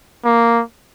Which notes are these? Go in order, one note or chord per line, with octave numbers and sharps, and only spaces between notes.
A#3